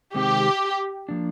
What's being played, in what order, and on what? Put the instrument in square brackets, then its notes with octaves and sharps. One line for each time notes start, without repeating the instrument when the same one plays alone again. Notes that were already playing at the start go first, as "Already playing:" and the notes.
[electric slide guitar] C3 D#3 G#3 C4 [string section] G4
[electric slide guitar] F3 A#3 D4